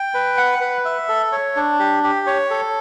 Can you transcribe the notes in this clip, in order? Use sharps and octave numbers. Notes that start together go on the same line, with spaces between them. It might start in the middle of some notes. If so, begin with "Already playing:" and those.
Already playing: G5
B4
F#5
B4
E5
A4
C#5
D4
G4
G4
C#5
A4